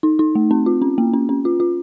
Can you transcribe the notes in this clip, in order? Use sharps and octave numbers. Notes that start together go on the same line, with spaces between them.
D#4
D#4
A3
C4
F4
C#4
A#3
C#4
C#4
F4
F4